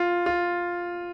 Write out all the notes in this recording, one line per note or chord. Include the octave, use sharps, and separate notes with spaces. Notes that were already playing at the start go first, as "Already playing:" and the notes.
Already playing: F4
F4